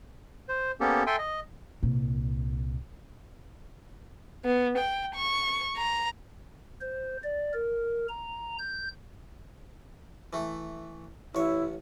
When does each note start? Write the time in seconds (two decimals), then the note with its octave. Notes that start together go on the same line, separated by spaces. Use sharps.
0.49 C5
0.80 A#3 B3 C#4 G4 A4
1.07 A4 E5 G5 G#5 C6
1.19 D#5
1.83 C2 A#2
4.45 B3
4.78 G5
5.15 C#6
5.77 A#5
6.81 C5
7.24 D5
7.53 A#4
8.09 A#5
8.59 G6
10.33 E3 A3
11.35 A1 E4 C#5